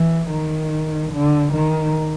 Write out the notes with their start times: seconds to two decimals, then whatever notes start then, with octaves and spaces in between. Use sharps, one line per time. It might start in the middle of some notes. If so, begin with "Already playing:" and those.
Already playing: E3
0.30 D#3
1.12 D3
1.53 D#3